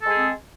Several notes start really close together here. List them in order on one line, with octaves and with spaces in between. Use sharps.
A4 G#3 G#4 C4